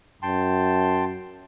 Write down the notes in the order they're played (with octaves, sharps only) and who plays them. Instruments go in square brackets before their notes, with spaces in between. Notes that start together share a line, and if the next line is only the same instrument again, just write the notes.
[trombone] F#2 [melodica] G5 A5 C6